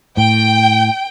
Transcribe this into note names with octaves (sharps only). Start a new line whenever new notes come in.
A2 G5